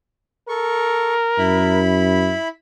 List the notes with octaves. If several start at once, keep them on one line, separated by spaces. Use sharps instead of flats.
A4 A#4 C#6
F#2 E4 B5